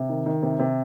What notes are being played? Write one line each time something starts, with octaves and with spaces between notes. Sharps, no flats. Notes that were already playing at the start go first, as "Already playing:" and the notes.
Already playing: C3
D#3
D#3
C3
C3